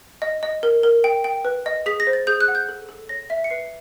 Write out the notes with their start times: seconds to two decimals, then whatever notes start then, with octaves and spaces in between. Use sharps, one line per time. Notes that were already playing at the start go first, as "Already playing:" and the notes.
0.22 D#5
0.43 D#5
0.63 A#4
0.83 A#4
1.04 G5
1.24 G5
1.45 B4
1.66 D#5
1.86 G#4 B6
2.00 A#6
2.07 C5
2.13 A6
2.27 G#4 G6
2.41 F#6
2.48 F#5
2.55 G6
2.69 A4
2.89 A4
3.09 C#5 A#6
3.30 E5 B6
3.44 C#7
3.50 B4 C7